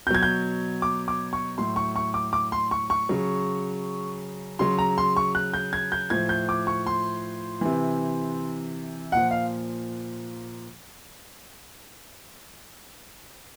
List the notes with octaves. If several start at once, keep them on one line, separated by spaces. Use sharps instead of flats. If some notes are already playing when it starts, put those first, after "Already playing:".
B2 F#3 G6 G#6
G6
D6
D6
C#6
A2 F#3 C6
C#6
C#6
D6
D6
C6
C#6
C#6
C#3 F#3
C#3 F#3 C6
A#5
C6
C#6
F#6
G6
G#6
G6
A2 F3 G#6
G6
D6
C#6
C6
C3 E3
A#2 F3 F#5
F5